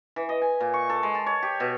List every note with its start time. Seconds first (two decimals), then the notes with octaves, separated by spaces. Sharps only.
0.16 E3
0.29 D#5
0.42 G#5
0.61 A#2
0.74 C#6
0.89 A4
1.03 G#3
1.15 A5
1.26 C#5
1.42 G4
1.60 B2